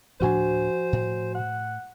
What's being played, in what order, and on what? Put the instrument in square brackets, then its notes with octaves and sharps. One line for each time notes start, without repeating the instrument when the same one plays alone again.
[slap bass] D2 A2 D4 [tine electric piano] F3 F#4 G#5 [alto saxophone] C5
[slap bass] A2
[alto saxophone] F#5